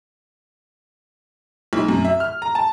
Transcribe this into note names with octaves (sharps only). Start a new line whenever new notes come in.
B1
F#2
E5
F6
A#5
A5